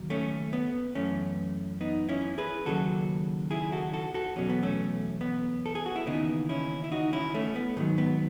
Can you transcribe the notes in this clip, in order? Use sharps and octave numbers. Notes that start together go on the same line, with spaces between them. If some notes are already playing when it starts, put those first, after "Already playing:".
Already playing: D#2 C#3 F#3
A3 C#4
B3
F#2 E3 A3 C#4
B3 D#4
C#4 E4
G#4 B4
D#2 C#3 F#3 F#4 A4
E4 G#4
F#4 A4
F#4 A4
F#4 A4
E2 B2 F#3 C#4
B3
A3 C#4
B3
A4
G#4
F#4
E4
D#2 C#3 E3 B3 D#4
C#4 E4
E4
D#4 F#4
C#4 E4
A3 C#4
B3
G#2 D#3 F#3 A3
B3